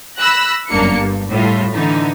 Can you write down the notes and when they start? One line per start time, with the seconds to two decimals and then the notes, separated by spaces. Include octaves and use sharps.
0.17 B5 E6 F#6 A#6
0.69 G1 F#2 A#3 D4 C#7
0.98 G2
1.29 A2 G3 F4
1.72 D3 E3 D#4